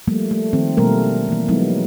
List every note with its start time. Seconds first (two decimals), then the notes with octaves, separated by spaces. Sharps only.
0.07 F3 G3 A3 A#3
0.31 A3
0.53 D#3 F3 C4
0.77 B2 F#3 G3 A3 A#3 A#4
1.29 E3 A#3
1.48 F3 F#3 G#3 B3 D#4 E4